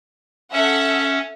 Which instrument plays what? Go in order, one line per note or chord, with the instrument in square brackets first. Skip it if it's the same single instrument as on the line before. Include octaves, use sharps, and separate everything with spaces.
[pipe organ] C#4 [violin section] A4 E5 F#5